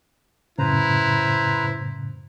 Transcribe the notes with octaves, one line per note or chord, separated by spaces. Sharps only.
F#2 A2 C#3 E4 B4 C5 A#5